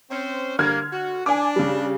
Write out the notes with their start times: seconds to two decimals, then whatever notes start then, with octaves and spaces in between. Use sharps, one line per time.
0.11 C4 C#4 C5
0.59 D3 G3 A#3 F6 G#6
0.93 F#4
1.26 D4 G#5 D6
1.56 C#3 G3